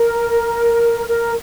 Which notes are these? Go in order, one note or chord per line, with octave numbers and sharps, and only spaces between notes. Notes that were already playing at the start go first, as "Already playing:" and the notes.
Already playing: A#4
A#4